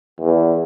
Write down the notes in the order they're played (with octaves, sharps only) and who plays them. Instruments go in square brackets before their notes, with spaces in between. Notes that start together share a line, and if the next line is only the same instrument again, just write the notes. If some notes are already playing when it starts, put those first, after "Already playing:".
[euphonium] E2